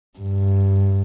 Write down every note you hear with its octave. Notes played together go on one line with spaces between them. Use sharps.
G2